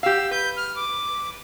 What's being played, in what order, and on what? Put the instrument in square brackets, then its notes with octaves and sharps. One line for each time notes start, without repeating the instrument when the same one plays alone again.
[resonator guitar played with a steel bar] G4 F5 [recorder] E6
[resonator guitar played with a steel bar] B4 [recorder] G6
[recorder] F6
D6